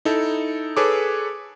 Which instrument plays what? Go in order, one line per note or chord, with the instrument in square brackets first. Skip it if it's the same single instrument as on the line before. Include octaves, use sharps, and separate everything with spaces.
[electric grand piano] D#4 E4 A4
G#4 A4 B4 C#5 D6